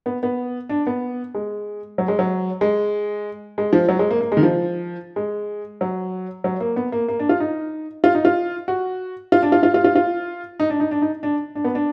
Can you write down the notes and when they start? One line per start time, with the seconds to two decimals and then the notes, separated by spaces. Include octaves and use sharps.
0.06 B3
0.23 B3
0.69 D4
0.87 B3
1.34 G#3
1.98 F#3
2.08 G#3
2.19 F#3
2.61 G#3
3.58 G#3
3.73 F3
3.89 F#3
3.99 G#3
4.10 A#3
4.21 A#3
4.32 G#3
4.37 D#3
4.43 F3
5.16 G#3
5.81 F#3
6.44 F#3
6.60 A#3
6.76 B3
6.92 A#3
7.08 A#3
7.19 D4
7.29 F4
7.40 D#4
8.04 F4
8.15 D#4
8.25 F4
8.68 F#4
9.32 F4
9.43 D4
9.52 F4
9.63 F4
9.74 F4
9.84 F4
9.95 F4
10.60 D#4
10.70 D4
10.80 D#4
10.91 D4
11.02 D#4
11.23 D4
11.55 D4
11.64 B3
11.75 D4